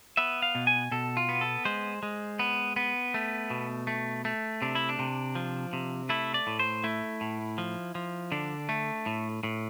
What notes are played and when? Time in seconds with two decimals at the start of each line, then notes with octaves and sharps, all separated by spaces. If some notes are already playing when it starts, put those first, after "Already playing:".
0.17 B3 E5
0.42 F5
0.55 B2
0.67 G#5
0.91 B2 A4
1.17 F4
1.29 B3
1.41 A4
1.65 G#3 C5
2.03 G#3
2.39 B3
2.76 B3
3.14 A3
3.50 B2
3.87 A3
4.25 A3
4.62 C3 D4
4.75 E4
4.89 D4
4.99 C3
5.35 F3
5.73 C3
6.09 A3 E4
6.34 D5
6.47 A2
6.59 C5
6.84 A3 E4
7.21 A2
7.58 F3
7.95 F3
8.32 D3 D4
8.69 A3
9.06 A2
9.43 A2